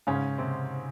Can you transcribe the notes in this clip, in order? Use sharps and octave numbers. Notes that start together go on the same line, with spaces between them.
G#2 C#3 C#4
C3 C4